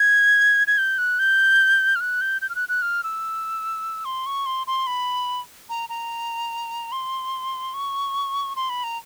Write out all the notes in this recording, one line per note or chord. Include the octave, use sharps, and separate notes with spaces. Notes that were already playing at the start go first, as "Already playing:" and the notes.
Already playing: G#6
G#6
G6
F#6
G6
F6
F#6
G6
G6
F6
F#6
F#6
F6
E6
C6
C#6
C6
C6
B5
A#5
A#5
C6
C#6
C6
B5
A#5